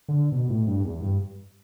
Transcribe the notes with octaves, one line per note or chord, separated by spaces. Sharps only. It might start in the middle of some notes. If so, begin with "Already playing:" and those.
D3
B2
A2
G2
E2
G2